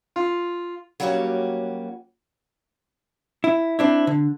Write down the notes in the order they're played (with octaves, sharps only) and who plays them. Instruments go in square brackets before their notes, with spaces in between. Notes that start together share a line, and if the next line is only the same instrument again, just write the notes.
[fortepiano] F4
[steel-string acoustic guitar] F#3 G3 A#3 C#4 F#4 G4
[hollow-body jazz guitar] E4
C4 D4 E4
D3